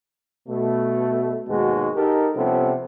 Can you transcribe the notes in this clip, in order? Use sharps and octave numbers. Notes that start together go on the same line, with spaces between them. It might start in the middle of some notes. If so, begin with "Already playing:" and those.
B2 A3
D#2 G#2 B2 G#3 F#4
D#4 G4 A4 A#4
C3 F3 G3 B3 C#4 A4